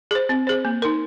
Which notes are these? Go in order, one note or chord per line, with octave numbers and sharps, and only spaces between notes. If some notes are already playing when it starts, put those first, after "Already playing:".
G#4 C5
C4
G#4 C5
A#3
D#4 A#4